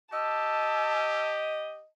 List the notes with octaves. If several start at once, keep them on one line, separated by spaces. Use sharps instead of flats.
G4 D#5 A5 E6